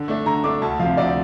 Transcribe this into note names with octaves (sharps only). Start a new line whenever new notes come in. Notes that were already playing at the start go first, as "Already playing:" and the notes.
Already playing: D3
A3 D4
D3 A#5
A3 D4 D6
D2 A5
C3 F3 F5
D2 D5